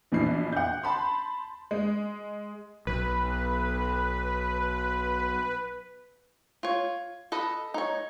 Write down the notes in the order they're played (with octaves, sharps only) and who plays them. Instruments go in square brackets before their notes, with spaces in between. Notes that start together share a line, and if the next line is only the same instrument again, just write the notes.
[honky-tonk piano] A#1 B2 E3 C7
F#5 G6
A5 B5 C6
G#3
[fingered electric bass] B1 [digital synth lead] B4
[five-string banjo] F4 C#5
A4 B4 D#5
D#4 C#5